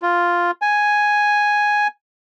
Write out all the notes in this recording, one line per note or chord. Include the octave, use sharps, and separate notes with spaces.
F4
G#5